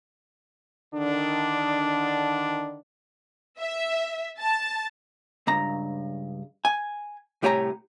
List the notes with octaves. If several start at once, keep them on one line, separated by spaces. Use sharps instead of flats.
D3 D#3 D4
E5
A5
C#2 G2 A#5
G#5
C2 A2 G4 C#5 G#5 A#5